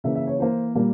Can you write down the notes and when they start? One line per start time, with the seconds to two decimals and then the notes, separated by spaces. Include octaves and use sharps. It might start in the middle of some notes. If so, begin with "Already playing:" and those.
0.04 C#3 E3 A#3 E5
0.15 E5
0.27 C#5
0.39 E3 A#3 C5
0.75 A#2 G3 A#3